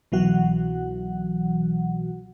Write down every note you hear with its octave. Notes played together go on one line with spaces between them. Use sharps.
C2 B2 E3 F#3 F#4 F#5